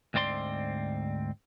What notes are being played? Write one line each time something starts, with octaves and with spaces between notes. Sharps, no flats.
D2 G#2 C4 D5 C6